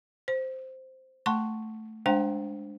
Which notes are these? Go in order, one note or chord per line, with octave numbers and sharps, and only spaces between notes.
C5
A3 F#5 A5 C6 C#6
G#3 D4 C5 F5 G5 A#5